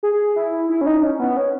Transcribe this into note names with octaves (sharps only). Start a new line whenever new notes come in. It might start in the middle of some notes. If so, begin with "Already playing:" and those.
G#4
E4
E4
C#4
D#4
C#4
B3
C#4